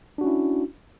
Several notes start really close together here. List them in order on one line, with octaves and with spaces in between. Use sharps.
D4 F#4 C#4 E4